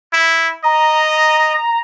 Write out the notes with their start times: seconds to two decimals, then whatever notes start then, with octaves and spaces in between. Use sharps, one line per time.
0.13 E4
0.64 D#5 A#5